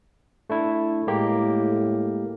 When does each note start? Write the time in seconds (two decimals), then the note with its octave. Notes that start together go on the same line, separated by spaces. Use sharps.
0.50 A3 D4 E4
1.07 A2 G#3 A#3 G4